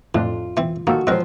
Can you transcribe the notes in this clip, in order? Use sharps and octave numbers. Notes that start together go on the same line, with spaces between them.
F2 A2 D4 F4
E3 C4
D#3 F3 A#3 F#4 A4
F3 F#3 G#3 B3 C4 A#4 C5